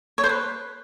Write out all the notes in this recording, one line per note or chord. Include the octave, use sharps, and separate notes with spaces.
C#5
C5
B4